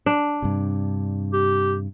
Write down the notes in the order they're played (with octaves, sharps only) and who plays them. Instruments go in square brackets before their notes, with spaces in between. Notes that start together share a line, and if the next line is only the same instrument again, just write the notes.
[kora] D4
[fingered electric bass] G2 C3
[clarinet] G4